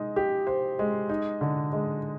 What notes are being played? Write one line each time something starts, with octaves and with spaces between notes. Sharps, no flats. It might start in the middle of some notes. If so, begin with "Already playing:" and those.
Already playing: G#3 D#4
G4
C5
G#3
D#4
D3
G#3